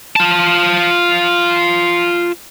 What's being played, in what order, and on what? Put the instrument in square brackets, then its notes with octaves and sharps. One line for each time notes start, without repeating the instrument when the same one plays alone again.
[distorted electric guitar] F4 A5